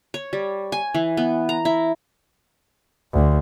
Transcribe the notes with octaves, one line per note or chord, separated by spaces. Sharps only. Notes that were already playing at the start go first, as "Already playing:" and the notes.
C#5
G3
G#5
E3
B3
A#5
E4
D2